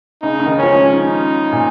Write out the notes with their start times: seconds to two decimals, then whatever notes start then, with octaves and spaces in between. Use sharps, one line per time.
0.22 C#3 D#4
0.40 C#3
0.46 D#3
0.58 C#4
0.63 F3
0.69 G#3
0.93 C#4 D#4
1.52 A#2